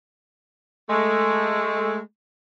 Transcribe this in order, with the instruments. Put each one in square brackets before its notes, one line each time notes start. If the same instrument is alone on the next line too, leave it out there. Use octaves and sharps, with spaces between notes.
[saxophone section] G#3 A3